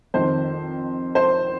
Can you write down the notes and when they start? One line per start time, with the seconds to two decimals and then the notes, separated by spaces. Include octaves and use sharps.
0.14 F2 D#3 C5
1.15 C5